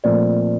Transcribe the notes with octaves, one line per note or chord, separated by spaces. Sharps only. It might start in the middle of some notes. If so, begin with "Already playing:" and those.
A#2 F3 A3 C4 D5